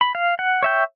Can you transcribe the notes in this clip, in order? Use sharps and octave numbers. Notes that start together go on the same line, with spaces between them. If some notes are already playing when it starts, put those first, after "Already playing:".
B5
F5
F#5
C#5 E5 G5